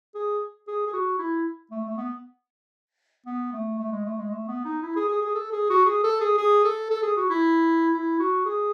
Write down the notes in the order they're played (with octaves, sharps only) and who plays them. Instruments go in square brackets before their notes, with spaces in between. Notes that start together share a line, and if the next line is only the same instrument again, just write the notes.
[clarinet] G#4
G#4
G#4
F#4
E4
A3
A3
B3
B3
A3
A3
G#3
A3
G#3
A3
B3
D#4
E4
G#4
G#4
G#4
A4
G#4
F#4
G#4
A4
G#4
G#4
A4
A4
G#4
F#4
E4
E4
F#4
G#4